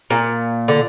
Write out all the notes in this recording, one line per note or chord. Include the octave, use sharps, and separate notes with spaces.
A#2
D3